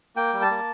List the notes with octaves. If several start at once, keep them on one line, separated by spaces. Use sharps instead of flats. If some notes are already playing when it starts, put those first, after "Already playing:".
A#3 G5
G3
A5
A#3